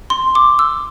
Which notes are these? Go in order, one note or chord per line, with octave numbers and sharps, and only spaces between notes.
C6
D6
E6